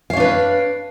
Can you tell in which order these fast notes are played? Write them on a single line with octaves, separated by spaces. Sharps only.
F5 C#5 D4 B4